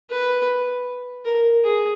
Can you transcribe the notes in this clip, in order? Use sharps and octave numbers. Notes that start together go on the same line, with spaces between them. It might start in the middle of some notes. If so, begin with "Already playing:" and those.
B4
A#4
G#4